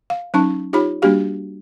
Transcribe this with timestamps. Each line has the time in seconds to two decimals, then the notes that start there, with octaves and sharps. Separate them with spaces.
0.10 F5
0.34 F#3 C#4 D#4 A5 C#6
0.73 D#4 F4 G4 C#5 B5
1.02 G3 A#3 D4 F#4 G4 F5